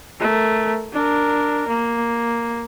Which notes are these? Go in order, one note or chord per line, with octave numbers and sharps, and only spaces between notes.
A3 A#4
D4 A#4
A#3